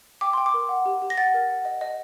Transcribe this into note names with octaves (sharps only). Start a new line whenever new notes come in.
G5 D6
G5 C6
D6
A#4
F#5
G4
G4
A#6
F#5 A6
A#4
F#5
D#5
D#5